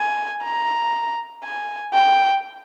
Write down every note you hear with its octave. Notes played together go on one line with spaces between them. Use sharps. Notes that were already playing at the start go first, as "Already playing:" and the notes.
Already playing: G#5
A#5
G#5
G5